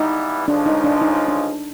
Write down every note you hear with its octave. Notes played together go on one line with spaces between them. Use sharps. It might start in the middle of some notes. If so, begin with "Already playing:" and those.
Already playing: G2 E3 G3 B3 D#4 E4
C#2 C#3 F3 G#3 D4
D#4
D4
D#4
D4